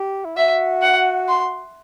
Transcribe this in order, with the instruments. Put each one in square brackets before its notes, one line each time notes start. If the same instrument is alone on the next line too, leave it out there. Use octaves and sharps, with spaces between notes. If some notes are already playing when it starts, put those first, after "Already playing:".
Already playing: [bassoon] G4
E4
[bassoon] F#4 [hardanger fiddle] E5
[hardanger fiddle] F#5
C6